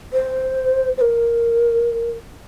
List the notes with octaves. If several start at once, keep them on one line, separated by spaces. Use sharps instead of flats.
C5
C5
A#4